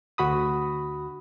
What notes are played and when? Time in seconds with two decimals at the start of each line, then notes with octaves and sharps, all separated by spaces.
0.18 D2 F#4 B5 D#6